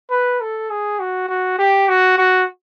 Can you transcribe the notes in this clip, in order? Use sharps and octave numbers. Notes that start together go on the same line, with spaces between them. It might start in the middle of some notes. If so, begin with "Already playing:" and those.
B4
A4
G#4
F#4
F#4
G4
F#4
F#4